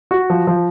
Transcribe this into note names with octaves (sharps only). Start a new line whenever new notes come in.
F#4
F3
F3